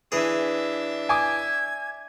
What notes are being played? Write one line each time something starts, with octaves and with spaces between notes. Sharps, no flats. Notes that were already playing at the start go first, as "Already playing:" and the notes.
E3 D4 G#4 E5
G#5 D6 G#6